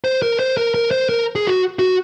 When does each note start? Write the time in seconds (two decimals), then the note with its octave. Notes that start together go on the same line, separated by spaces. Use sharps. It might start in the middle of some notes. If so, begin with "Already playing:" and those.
0.04 C5
0.22 A#4
0.39 C5
0.57 A#4
0.74 A#4
0.91 C5
1.09 A#4
1.35 G#4
1.47 F#4
1.79 F#4